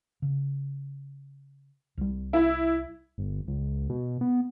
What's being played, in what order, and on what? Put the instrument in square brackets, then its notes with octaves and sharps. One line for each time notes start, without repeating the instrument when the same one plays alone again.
[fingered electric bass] C#3
C2 G3
[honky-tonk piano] E4
[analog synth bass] G1
C#2
B2
B3